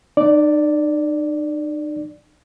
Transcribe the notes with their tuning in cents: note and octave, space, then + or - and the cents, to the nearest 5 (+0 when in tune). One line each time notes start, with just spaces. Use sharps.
D#4 -45 D5 +0